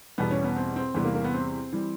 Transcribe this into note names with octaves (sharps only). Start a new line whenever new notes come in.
E2 B2 G3 B3
C#4
B3
C4
C4
E2 C3 E3 G3 B3
A#3
A#3
B3
C4
E3 G3